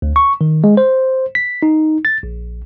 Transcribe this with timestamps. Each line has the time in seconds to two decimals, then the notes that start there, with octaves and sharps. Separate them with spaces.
0.02 D2
0.16 C#6
0.41 D#3
0.64 G#3
0.77 C5
1.35 B6
1.63 D#4
2.05 A6
2.23 A#1